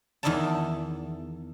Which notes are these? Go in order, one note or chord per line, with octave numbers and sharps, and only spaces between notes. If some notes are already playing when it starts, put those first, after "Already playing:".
E2 D#3 D#4 E4 D5 A5